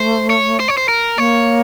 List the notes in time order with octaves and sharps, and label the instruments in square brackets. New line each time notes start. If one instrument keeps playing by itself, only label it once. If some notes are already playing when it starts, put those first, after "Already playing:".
Already playing: [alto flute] A3 [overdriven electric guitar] C5
[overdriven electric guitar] C#5
C5
C#5
C5
A#4
[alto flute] A#3 [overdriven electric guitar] C#5